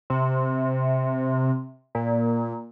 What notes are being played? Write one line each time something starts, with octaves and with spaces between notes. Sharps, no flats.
C3
A#2